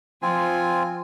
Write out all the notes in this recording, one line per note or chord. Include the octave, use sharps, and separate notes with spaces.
F3 C4 F4 G#5